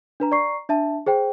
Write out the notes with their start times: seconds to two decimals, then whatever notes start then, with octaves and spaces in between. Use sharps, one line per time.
0.20 D4 B4 A#5
0.32 D5 A#5 C#6 C7
0.69 D4 E5 A5
1.07 G#4 C5 G5